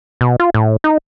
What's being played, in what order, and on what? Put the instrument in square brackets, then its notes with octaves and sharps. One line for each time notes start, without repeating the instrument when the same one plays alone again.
[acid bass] B2
F4
A2
D#4